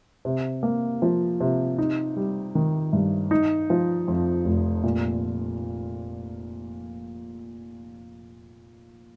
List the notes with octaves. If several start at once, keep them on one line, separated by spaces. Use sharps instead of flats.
C3
A#3
F3
C3
D#4
G3
D#3
G2
D#4
F3
F2
F1
A#2